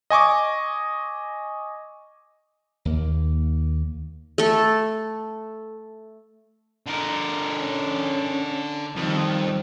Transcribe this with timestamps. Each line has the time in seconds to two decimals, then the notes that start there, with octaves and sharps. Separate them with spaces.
0.10 D#5 G#5 C#6 D6
2.85 D#2 A#3
4.38 A3 A4
6.87 D3 A#4
7.57 C#4
8.96 F2 D#3 G3